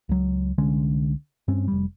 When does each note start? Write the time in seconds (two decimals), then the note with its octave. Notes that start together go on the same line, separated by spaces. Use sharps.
0.09 C#2 F#3
0.58 C2 D3 G#3 C#4
1.48 G2 C4 C#4
1.68 F1 G3